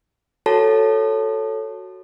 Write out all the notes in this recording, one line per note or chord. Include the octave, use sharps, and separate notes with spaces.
F#4 A4 C#5 A5